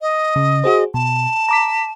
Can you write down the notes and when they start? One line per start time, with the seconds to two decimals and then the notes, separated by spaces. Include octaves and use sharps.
0.01 D#5
0.36 C#3
0.64 F#4 G#4 C5
0.94 B2 A5
1.49 A#5 D6 B6